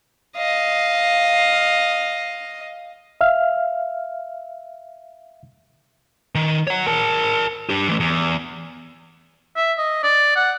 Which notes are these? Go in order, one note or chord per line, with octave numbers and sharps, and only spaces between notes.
D#5 F5
E5 F5 F6
D#3
C#5 F#5
A#4 A5
D4 G4
E3 A3
E2
E5
D#5
D5
F#5